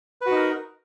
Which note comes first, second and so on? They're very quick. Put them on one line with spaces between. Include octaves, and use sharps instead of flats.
B4 F#4 D#4 A#4